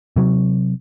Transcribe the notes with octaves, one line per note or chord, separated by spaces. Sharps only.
C3 F#3